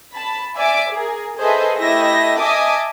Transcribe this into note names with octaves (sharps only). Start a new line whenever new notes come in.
A5 B5
D5 E5 G#5 D6
G#4 A#4
G#4 A4 B4 C5 D#5 E5
A3 E4 G4 D#5 E5 A#6
D#5 E5 G#5 A5 D6 D#6